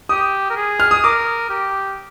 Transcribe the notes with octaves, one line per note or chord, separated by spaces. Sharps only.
G4 D#6
A#4
G#4
F6
D#6
A#4 D6
G4